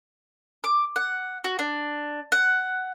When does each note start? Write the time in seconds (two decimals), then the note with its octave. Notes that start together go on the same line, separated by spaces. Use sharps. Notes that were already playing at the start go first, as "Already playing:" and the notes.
0.64 D6
0.96 F#5
1.44 F#4
1.59 D4
2.32 F#5